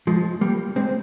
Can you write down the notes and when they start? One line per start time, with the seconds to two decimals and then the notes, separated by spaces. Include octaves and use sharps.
0.07 F3 G#3
0.41 G3 A#3
0.76 G#3 C4